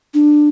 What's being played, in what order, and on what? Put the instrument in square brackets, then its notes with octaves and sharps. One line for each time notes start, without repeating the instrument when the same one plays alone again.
[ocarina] D4